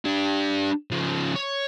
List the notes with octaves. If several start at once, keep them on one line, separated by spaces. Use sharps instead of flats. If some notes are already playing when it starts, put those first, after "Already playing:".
D4 G4
C#3 F3
C#5